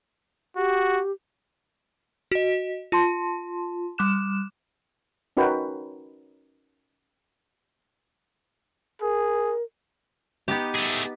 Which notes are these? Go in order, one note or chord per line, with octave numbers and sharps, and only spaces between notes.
F#4 G4
F#4 D#5
F4 A5 C6
G3 D6 F#6 E7
C#4 D#4 F#4 A#4 B4 G5
G#4 A#4
B3 D#4 G4
A3 G#4